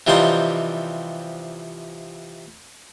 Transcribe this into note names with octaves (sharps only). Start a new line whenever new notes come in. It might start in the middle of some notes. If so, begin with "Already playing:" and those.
C3 E3 F3 G3 D#4 C5